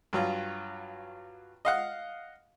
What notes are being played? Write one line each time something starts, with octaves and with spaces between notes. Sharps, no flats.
G2 F#3 F4
D#5 F5 F#5